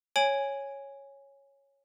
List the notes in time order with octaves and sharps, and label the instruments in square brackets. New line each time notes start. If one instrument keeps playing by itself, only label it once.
[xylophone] C#5 G#5 D7 F#7